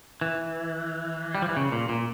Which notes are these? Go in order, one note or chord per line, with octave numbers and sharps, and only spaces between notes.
E3
G3
F3
E3
C#3
A#2
A#2